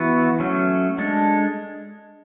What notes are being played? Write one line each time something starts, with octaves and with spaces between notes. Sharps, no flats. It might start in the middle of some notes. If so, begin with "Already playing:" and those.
Already playing: E3 B3 F#4
F#3 A3 C#4
G#3 D4 A4